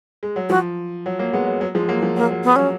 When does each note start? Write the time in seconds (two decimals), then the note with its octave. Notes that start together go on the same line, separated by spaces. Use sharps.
0.23 G#3
0.36 F#3
0.50 F3 F#4
1.06 F#3
1.19 F#3 A#3
1.33 G#3 B3
1.46 F#3
1.61 F#3
1.75 F3 G#3
1.88 F#3 A#3
2.02 F3
2.17 F#3 A#3
2.31 F#3
2.44 B3
2.56 F#3 C#4